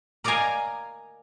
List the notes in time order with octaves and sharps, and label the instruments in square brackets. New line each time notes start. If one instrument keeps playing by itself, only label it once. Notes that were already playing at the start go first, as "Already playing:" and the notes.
[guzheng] A#4 D5 D#5 F5 G#5 A#5